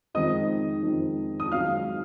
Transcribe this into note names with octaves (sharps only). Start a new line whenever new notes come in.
F2 D#3 G#3 C4 D#5 D#6
F2 D#3 G#3 C4
D#6
G#1 G#2 F#3 F5 F6